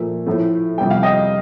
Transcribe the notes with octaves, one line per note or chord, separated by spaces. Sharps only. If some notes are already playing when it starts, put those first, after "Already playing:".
Already playing: A#2 F3 A3
A2 F3 A3
F2 C3 G3 G5
F5
D#5 G5